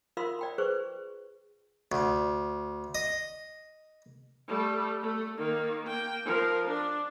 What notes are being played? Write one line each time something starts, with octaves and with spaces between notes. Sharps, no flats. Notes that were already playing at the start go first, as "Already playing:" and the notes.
F4 A#4 F5 B5 C6 E6
D5 G5 B5
G#4 B4 C5 C#6
D2
D#5
G3 A3
A3
D#3 A#3
A#3 G5
F3 A#4
D4